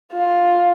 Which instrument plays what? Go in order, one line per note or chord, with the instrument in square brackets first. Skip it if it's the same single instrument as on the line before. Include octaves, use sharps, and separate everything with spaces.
[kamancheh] F4